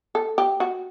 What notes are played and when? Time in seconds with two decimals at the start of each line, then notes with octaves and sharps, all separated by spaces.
0.15 A4
0.38 G4
0.60 F#4